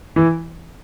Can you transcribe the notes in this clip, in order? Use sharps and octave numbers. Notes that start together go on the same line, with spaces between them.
E3 E4